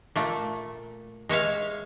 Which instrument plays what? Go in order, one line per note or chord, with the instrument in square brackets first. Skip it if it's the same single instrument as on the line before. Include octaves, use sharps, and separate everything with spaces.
[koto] A#2 A3
G#3 C#5 E5 F5